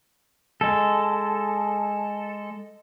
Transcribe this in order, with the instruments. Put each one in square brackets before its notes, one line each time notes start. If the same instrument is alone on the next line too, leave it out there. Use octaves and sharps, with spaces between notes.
[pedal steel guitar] G#3 A4